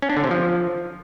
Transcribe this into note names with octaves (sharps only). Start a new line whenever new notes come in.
C#4
D4
D3
C3
F3